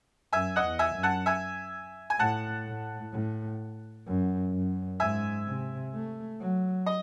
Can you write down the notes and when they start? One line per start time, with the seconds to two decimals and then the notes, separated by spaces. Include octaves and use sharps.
0.33 F#2 E5 G#5
0.56 D#5 F#5
0.63 E2
0.79 E5 G#5
0.95 F#2
1.03 F#5 A5
1.26 E5 G#5
2.10 G#5
2.19 A2 F#5 A5
2.66 A2
3.13 A2
4.07 F#2
4.54 F#2
5.00 G#2 E5 G#5
5.46 C3
5.94 A3
6.41 F#3
6.86 D#5